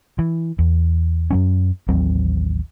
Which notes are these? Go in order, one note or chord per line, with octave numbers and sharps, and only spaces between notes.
E3
E2
F#2 F#3 C#4
A1 D#2 F#3 C4